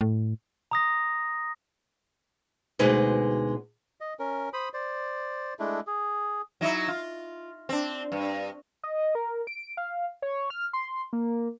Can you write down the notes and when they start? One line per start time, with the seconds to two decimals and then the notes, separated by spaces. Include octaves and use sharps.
0.01 A2
0.71 A#5 D#6 A#6
2.79 D2 B2 G#3 D#4 B4 C5
4.01 D#5
4.19 C#4 A#4
4.53 C5 B5 D#6
4.74 C5 D5
5.59 G#3 A3 D4 E4
5.87 G#4
6.61 F#3 D#4 E4
6.88 F4
7.69 C4 D4
8.12 G2
8.83 D#5
9.15 A#4
9.47 D7
9.77 F5
10.22 C#5
10.50 F6
10.73 C6
11.13 A#3